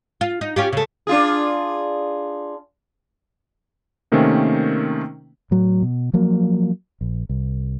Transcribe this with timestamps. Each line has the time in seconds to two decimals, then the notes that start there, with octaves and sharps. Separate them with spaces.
0.21 F4
0.41 D#4
0.56 C#4 F4 G4
0.73 C#3 A3
1.07 D4 F4 G#4
4.12 C3 D#3 A3 A#3 C4 C#4
5.51 A2 F#3
5.82 B2
6.13 F3 F#3 A#3
7.01 A#1
7.29 C2